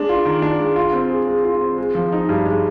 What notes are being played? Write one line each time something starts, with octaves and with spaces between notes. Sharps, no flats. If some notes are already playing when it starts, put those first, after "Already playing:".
Already playing: G#3 D4
F4
D#3
D4
G#3
F4
C4
G#4
G#3
F4
C4
G#3
F3
D#4
G2
G#3